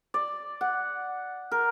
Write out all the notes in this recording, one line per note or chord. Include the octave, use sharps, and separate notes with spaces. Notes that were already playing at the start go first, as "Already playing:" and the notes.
D5
F#5
A#4